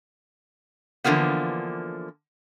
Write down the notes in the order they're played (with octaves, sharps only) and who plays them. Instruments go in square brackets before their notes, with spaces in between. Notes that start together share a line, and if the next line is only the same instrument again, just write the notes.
[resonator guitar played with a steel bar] D3 E3 F3 A#3 B3